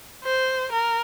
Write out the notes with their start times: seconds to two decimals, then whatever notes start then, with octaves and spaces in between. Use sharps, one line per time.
0.24 C5
0.72 A#4